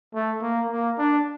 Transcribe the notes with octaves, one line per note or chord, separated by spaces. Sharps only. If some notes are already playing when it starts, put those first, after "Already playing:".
A3
A#3
A#3
D4